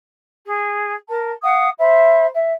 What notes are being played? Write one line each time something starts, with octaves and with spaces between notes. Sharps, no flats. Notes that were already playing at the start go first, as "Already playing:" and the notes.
G#4
A#4 A5
F5 F#5 D#6
C5 E5 B5
E5